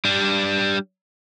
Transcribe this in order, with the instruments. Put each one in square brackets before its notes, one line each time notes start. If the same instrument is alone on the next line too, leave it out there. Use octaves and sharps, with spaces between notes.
[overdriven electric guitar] G3 D4